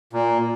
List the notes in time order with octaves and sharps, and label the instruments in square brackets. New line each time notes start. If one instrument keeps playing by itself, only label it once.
[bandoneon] A#2